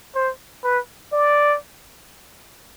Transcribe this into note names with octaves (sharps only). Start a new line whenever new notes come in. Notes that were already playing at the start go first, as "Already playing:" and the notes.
C5
B4
D5